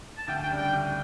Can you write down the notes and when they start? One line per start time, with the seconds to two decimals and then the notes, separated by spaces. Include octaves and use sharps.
0.18 A5
0.28 D2 G5
0.43 G5
0.50 C#3 G3 D4
0.57 G5
0.73 D2